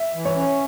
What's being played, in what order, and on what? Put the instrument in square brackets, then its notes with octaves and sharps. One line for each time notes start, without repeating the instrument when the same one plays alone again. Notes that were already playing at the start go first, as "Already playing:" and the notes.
Already playing: [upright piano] E5
[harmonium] E3
[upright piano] C#5
[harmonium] C#4